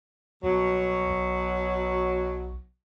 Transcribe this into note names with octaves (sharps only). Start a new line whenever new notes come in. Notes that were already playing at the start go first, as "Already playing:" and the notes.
C2 B2 F#3
B1